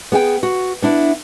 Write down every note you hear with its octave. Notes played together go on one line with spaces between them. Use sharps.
B3 G#4 F#5 G5
F#4
B3 D4 E4